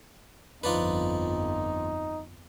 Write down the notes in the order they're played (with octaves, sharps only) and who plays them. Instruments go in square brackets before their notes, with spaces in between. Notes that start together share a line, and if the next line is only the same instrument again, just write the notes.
[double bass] G1 F2 [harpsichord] F3 D4 B4 [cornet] D#4